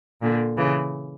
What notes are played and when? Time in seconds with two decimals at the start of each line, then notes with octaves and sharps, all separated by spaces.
0.22 A#2 D3
0.57 C#3 E3